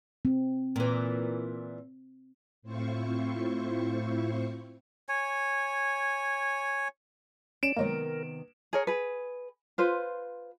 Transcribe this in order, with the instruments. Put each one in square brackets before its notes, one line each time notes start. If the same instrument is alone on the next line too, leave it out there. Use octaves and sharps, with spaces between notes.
[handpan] C4
[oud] A#2 E3
[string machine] A2 C4 E4 F4 C5 C#6
[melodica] C#5 G#5
[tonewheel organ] C#4 [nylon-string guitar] D5 [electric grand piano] D7 E7
[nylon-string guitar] C3 D#3 B3 [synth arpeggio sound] F#3 G#3 A#3 [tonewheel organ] A#4
[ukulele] G#4 A#4 C#5
G#4 B4
F4 B4 C5